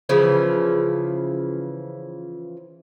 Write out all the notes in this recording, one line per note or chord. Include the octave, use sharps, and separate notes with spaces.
C#3 E3 F3